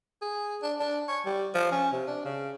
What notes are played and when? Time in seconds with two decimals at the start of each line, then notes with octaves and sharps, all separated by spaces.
0.22 G#4
0.62 D4
0.80 D4
1.08 C#5
1.25 G3
1.55 F3
1.72 C#4
1.92 C3
2.07 D4
2.25 C#3